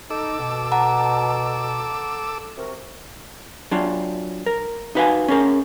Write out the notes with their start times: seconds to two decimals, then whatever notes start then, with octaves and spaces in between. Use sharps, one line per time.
0.10 D#4 A4 D6 E6
0.40 B2
0.72 F#5 A5 A#5
2.57 C3 F#4 A#4
3.71 F#3 D4 F4
4.46 A#4
4.95 D#4 F#4 B4 E5 F5 G#5
5.28 C#4 G#4 A#4